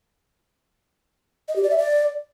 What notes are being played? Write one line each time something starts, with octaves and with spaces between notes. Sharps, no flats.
D#5
G4
D5
E5
D5